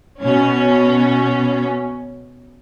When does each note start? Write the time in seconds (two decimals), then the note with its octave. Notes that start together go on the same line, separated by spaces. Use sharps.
0.22 B2 C#4